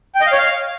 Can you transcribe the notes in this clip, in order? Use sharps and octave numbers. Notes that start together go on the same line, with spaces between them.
G5
D#5
F5
C#5
F5